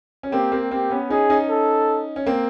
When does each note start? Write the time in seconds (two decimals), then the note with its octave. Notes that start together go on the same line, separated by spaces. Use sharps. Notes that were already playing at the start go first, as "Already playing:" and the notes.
0.23 C#4
0.32 A#3 C4 G4
0.52 A#3 C4
0.71 A#3 C4 G4
0.90 B3 C#4
1.10 C#4 D#4 G#4
1.30 C#4 D#4
1.49 A4
2.16 C#4
2.26 A#3 C4